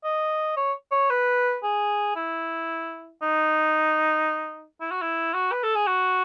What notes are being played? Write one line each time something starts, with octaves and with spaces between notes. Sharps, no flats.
D#5
C#5
C#5
B4
G#4
E4
D#4
E4
F#4
E4
F#4
B4
A4
G#4
F#4